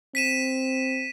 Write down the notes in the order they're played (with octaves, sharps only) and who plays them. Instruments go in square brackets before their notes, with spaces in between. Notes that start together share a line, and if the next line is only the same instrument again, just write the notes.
[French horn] C4 [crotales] B6 D#7 E7